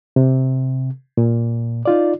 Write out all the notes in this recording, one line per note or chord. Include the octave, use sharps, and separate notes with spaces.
C3
A#2
D#4 F4 D5